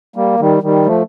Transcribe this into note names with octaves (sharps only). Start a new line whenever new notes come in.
G3 A#3
D#3 G3
D#3 G3
F3 A3